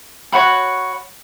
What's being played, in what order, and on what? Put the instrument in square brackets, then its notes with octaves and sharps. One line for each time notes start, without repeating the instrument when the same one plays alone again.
[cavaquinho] F#4 C#5 F#5 B5